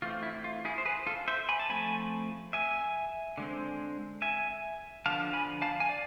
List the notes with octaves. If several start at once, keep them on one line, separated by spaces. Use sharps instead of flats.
E3 A3 C4 F4
E4
F4
E4 G#4
C5
G#4 B4
F4 A4
C5 E5
G#5 B5
A5
F3 A3 C4 G#5 B5
E5 G#5
D3 G#3 C4
E5 G#5
D3 F3 B3 F5 A5
G#5 B5
F5 A5
G#5
D5 F5